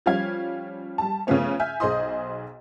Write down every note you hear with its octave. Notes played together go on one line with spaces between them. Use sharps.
F3 G3 C#4 F5 G#6
G3 A5
C#3 F3 A3 B3 C#4 C#5
E5 G#5 F6 G6
B1 G#4 C5 D#5 C6 D#6